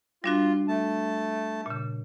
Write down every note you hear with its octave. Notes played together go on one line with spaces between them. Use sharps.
G3 D4 F4 F#4
A3 A5
A#2 C#3